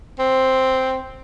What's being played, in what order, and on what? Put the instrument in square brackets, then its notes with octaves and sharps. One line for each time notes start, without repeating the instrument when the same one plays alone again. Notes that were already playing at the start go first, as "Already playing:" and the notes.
[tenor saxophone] C4